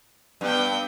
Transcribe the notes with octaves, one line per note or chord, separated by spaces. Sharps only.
G2 B3 G5